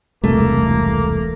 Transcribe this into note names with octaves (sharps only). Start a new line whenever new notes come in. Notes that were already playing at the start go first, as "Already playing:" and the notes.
E1 C2 A3 A#3